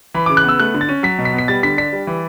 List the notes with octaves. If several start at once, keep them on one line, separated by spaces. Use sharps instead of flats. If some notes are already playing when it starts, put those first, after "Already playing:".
E3 B5
C#3 D6
F#6
B3 E6
A3 F#6
D3
A6
C#4
F#3 B6
B2
B6
B3
B6
G3 A6
D3 B6
D4 B6
G3
E3